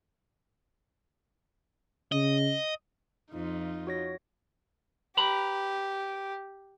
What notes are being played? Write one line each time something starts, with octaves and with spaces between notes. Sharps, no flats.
C#3 D#5
F2 D#4 F4
F#4 C#5 A#6
G4 B4 A#5 B5